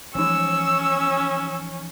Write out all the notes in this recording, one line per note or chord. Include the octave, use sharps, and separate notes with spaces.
E3 F3 C#4 D#4 E6